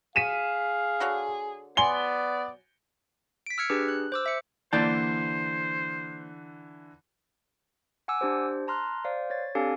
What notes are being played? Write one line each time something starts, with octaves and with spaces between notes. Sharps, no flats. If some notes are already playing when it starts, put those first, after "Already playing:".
G#4 F5 B6 D#7 E7
D3 F#4 C#5
F#3 B3 D5 G#5 C6 G7
B6 D7
E6 F6 G#6 C#7
D4 G4 G#4 B4
F#6
C5 D6 E6
E5 C#7
D3 E3 A#3 C5 D5 A5 G6
F#5 G#5 D6 E6
D4 G4 C5
A5 A#5 C6 F6 F#6
C5 D5 F5
C#5 A6
C4 D4 G4 A4 F5 G#5